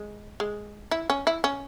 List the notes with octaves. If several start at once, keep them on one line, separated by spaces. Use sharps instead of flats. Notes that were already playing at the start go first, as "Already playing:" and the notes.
Already playing: G#3
G#3
E4
C#4
E4
C#4